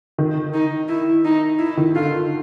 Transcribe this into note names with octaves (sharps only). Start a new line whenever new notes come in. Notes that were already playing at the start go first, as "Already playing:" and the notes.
D#3
D#4
E4
D#4
E4
D#3
D3 F4